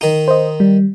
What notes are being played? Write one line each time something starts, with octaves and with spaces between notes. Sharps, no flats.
D#3 D#4
C5 D#5
G3